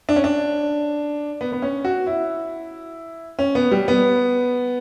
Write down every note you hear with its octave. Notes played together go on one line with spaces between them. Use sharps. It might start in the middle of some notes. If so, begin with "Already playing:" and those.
D4
C#4
D4
B3
B3
C#4
F#4
E4
C#4
B3
G3
B3